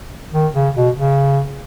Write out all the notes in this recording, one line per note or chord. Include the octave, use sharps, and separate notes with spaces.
D#3
C#3
B2
C#3